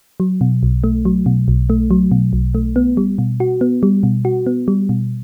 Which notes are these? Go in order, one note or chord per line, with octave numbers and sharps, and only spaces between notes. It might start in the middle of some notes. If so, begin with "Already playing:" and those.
F#3
B2
B1
A3
F#3
B2
B1
A3
F#3
B2
B1
A3
B3
G3
B2
F#4
B3
G3
B2
F#4
B3
G3
B2